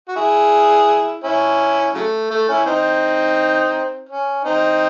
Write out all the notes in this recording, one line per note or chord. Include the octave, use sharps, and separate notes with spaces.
F#4
E4 G#4
C#4 E4
C#3 F#3 A3
A3
C#4 E4
C4 D#4
C#4
C4 D#4